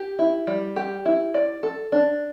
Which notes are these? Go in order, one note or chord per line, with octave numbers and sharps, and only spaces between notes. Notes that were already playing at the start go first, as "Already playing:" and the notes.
Already playing: G4
E4
G3
G4
E4
D5
A4
D4